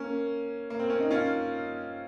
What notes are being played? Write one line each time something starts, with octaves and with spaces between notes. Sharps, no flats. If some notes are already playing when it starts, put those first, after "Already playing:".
Already playing: A#3 C#4
A#3
C4
C#4
D#4
C#4 F4